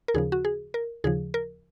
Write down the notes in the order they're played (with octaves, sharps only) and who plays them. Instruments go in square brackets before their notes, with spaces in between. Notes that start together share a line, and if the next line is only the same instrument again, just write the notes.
[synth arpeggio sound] A#4
D#2 C#3 F3 G#4
F#4
G#4
A#4
D#2 C#3 F3 G#4
A#4